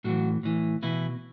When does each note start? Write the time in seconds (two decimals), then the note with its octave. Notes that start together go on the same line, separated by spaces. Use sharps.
0.04 A2 E3 F#3 F#4
0.43 A2 E3
0.82 B2 E3 E4